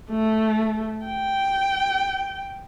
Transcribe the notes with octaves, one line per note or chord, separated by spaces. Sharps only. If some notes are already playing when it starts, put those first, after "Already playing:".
A3
G5